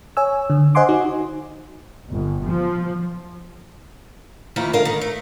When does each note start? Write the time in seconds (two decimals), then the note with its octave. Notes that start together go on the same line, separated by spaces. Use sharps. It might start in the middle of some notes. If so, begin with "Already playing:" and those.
0.17 C#5 G#5 E6
0.50 D3
0.75 C5 D#5 F#5 G#5 C6 D6
0.89 D#4 F#4
2.10 G1
2.45 F3
4.56 F2 D#3 A#3 E4
4.73 G#2 D3 A#4 F5
4.85 D#3
5.01 A3